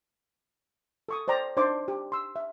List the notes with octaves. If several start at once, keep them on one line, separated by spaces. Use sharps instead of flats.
A4 C#6 D#6
C5 D5 G5 A#5
D4 D#4 C5 D5 C6 D6
G4
C6 E6
E5